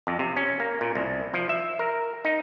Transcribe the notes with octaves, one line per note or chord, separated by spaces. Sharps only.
F2
C3
C#4
A#3
A#2
C2
F3
E5
A#4
D#4